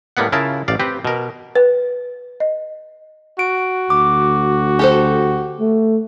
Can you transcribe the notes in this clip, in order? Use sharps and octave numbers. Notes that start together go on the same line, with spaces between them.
A2 G3 A#3 B3 F#5
C#3 E4 F4 A#4 A5
A1 D5 F5
C4 G4 B4
B2 A#4
B4
D#5
F#4 D7
D2 D6
G4 A4 C5
A3